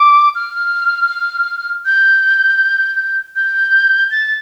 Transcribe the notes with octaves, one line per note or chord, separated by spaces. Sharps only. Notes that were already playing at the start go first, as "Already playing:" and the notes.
Already playing: D6
F6
G6
G6
A6